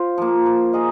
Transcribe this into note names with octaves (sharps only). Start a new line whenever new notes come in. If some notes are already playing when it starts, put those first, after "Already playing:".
Already playing: F4 C5
F3 A#3
A#3
D#4 G#4 D#5